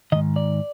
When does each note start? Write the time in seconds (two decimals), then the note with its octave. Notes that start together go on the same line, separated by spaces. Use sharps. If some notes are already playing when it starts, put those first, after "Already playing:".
0.12 D#3 D#5
0.15 G#2
0.36 D5